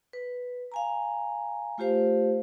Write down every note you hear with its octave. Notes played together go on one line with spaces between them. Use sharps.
B4
F5 G#5 A#5
A3 F4 G4 C5 F5